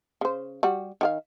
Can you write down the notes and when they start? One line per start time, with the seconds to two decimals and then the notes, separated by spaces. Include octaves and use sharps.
0.21 C#3 C5
0.63 G3 F#4
1.01 D#3 G4 F5